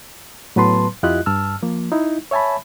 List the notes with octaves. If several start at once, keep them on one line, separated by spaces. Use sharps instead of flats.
A2 F#3 B3 B4 A5 C6
F2 E4 F4 G4 D#5 F#6
G2 A5 E6 F6
F3 A#3
D#4 E4
C#5 E5 G#5 A5 B5